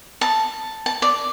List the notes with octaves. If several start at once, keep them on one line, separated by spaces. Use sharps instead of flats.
A5
A5
D5